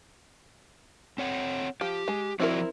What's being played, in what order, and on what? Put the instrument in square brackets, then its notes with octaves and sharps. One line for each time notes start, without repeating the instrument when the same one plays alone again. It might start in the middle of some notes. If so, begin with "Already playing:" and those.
[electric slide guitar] C4 C#5 F#5
[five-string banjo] F3 [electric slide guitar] G4
[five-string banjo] G#3
[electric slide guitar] F3 F#4 D5 [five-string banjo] C4 E4 A#4